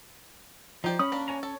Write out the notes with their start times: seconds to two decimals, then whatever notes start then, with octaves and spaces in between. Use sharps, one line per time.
0.84 F3 D#4 G4 D5
0.99 C#4 B5 D#6
1.12 A#3 D4
1.28 C#5 G#5 A#5
1.43 A4 C#5